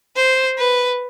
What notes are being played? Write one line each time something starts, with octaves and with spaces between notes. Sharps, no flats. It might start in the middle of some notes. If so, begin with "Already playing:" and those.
C5
B4